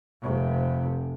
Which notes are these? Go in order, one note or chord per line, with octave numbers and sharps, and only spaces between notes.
F1 C3